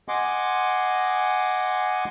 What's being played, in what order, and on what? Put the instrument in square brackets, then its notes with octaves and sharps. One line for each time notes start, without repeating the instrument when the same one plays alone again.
[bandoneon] D#5 F#5 G#5 C6 D6